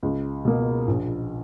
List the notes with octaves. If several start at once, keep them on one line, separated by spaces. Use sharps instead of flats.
C#2
B2 A#3
A#1